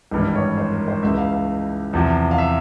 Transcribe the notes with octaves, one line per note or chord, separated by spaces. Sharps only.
G#1 G2 E3 G3
C#5
C5
A#4
C5
C#2 C#3 E3 E5
F5
F5
E2 C3 F3
F5
E5